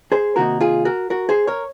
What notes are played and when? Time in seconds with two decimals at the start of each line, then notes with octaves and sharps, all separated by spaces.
0.12 G#4 C5
0.36 C3 D#3 A#3 D#4 F#4 A#4
0.61 F4 G#4
0.85 F#4 A#4
1.10 F#4 A#4
1.29 G#4 C5
1.47 A#4 C#5